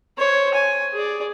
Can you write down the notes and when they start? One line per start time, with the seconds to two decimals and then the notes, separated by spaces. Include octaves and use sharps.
0.18 C5 C#5
0.54 G#5
0.94 G#4 D5